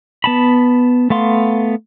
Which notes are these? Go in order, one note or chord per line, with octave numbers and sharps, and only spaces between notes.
B3 A5 B5
A3 B3 F5 C6